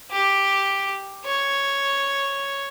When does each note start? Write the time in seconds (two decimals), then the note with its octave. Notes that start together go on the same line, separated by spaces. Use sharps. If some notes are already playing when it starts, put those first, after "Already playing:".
0.12 G4
1.25 C#5